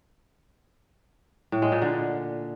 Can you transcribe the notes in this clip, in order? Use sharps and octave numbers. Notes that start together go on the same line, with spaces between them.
A2
G#3
A#2
D3